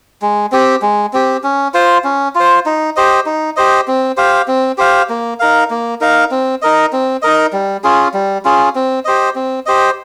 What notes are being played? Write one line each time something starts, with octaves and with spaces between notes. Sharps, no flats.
G#3
C4 G4
G#3
C4 G4
C#4
F4 C5
C#4
F4 C5
D#4
G4 C5 D#5
D#4
G4 C5 D#5
C4
G4 C5 F5
C4
G4 C5 F5
A#3
D#4 A#4 F5
A#3
D#4 A#4 F5
C4
D#4 A#4 D#5
C4
D#4 A#4 D#5
G3
C#4 F4 G#4
G3
C#4 F4 G#4
C4
G4 C5 D#5
C4
G4 C5 D#5